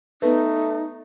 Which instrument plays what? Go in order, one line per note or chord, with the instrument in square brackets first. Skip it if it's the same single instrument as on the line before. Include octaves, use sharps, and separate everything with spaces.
[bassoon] A3 [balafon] B3 B4 [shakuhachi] D#4